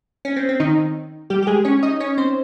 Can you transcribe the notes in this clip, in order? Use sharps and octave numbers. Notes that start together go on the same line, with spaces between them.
C#4
C4
C4
D#3 D#4
G3 G4
G4
G#3 G#4
C#4 C#5
D#4 D#5
C#4 C#5
C4 C5